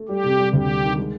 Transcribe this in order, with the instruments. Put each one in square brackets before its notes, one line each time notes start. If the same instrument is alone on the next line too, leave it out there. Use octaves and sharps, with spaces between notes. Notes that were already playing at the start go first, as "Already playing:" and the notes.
Already playing: [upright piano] A3
[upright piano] G3 [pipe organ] G4
[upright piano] C3
G3
[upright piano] D2 [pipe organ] G4
[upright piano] G3
D#3
G#3